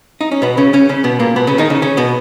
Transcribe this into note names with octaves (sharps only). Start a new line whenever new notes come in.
D#4
C#4
B2 B3
C#3 C#4
C#3 C#4
C#3 C#4
B2 B3
A#2 A#3
B2 B3
C#3 C#4
D#3 D#4
C#3 C#4
C#3 C#4
B2 B3